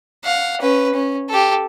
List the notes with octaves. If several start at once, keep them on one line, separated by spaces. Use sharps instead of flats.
F5 F#5
C#4 B4
C#4
G4 A4